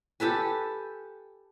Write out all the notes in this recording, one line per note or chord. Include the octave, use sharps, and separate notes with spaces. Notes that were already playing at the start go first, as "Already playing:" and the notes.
G4 A4 B4 G#5